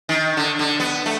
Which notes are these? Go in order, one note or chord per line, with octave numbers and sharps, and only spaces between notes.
D#3
D3
D3
B3
A3